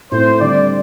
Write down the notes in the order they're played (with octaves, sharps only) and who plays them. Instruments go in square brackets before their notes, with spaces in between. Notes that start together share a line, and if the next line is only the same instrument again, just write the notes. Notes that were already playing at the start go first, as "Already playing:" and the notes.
[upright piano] A2 A3 C4 [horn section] C5
[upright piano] D3 G3 C4 [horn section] D5